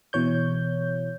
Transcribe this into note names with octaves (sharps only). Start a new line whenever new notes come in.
B2 E3 C#5 G6